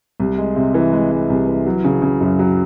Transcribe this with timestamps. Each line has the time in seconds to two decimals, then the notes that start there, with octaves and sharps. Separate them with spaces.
0.20 C2
0.38 G#3
0.56 C3
0.74 E3
0.93 G#3
1.11 G#3
1.30 C2
1.48 E3
1.66 F#3
1.84 C#3
2.02 C#3
2.21 F#2
2.39 F#3